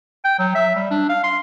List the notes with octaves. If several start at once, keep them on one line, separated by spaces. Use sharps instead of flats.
G5
F#3
E5
G3
D4
F5
C6